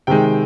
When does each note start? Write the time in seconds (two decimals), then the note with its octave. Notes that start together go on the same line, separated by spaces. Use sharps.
0.07 C3 D#3 G#3 G5